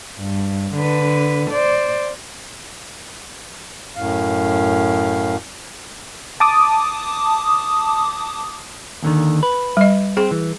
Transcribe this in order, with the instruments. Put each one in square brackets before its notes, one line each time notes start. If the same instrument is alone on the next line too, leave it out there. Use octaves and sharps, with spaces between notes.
[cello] G2
D3 B4
C5 D5
[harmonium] F#2 A2 F5
[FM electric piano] A5 D6 D#6
[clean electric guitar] D#2 D3 D#3
B4
[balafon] G3 D#5
[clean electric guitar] C4 [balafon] G#4
[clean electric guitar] E3